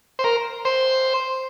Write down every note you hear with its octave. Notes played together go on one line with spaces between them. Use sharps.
C5
A#4
C5